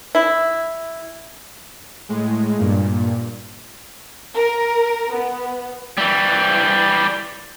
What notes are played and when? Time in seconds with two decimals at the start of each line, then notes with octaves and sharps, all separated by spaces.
0.15 E4
2.09 A2 G#3
2.58 G2 A#2
4.35 A#4
5.13 B3
5.98 E3 G3